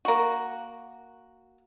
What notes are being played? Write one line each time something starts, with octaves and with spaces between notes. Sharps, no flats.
A#3 F#4